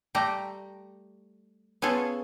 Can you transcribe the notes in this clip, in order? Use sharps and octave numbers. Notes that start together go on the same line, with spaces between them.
G3 A3 G4 A#5
B3 C#4 F4 G#4 A4